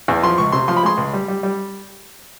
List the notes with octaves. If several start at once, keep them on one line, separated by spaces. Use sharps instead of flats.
E2
F3 C6
C#2 C#6
C3 C6
F3 C6
B5
G#3 C6
C#2
G3
G3
G3